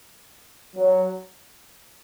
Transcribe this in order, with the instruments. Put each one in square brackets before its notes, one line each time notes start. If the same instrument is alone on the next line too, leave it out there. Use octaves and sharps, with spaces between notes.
[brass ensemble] F#3